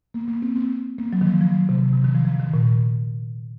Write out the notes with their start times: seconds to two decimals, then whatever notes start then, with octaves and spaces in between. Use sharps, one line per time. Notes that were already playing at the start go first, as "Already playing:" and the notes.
0.14 A#3
0.28 A#3
0.42 C4
0.56 C4
0.98 A#3
1.13 F#3
1.21 D#3
1.27 F3
1.41 F3
1.54 F#3
1.69 C3
1.83 C3
1.93 C3
2.04 D#3
2.15 F3
2.25 F3
2.40 D#3
2.54 A#2